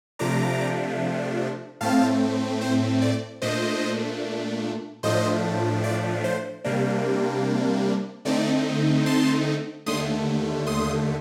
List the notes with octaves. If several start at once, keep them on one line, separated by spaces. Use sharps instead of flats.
C3 F3 A3 D4 A#5 D6
A2 A3 C4 F5 A5
C5
D5
A#2 A3 D4 C5 D#5
A2 F3 A3 D4 C5 D#5
D5
C5
C3 G3 A#3 D4
D3 A3 C4 D#4 D5
A5 C6
D#2 D3 A3 C6 D#6
C6 D#6